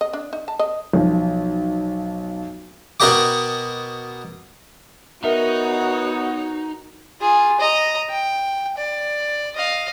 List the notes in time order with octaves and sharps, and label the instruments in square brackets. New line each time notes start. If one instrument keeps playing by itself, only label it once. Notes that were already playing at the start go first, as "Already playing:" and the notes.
[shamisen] D#5
D4
D#4
A5
D#5
[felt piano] B1 F3
[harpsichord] B2 F#4 A#4 D#5 G5 D6
[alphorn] B3 [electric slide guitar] D#4 [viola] F#4 C#5 [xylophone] A#4 E5
[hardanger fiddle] F4 G#4
D#5 A#5
G5
D5
D#5 F5